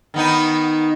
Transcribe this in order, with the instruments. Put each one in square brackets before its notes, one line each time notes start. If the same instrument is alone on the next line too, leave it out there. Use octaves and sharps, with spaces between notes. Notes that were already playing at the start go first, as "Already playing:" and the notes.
[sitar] D#3 B3 D#4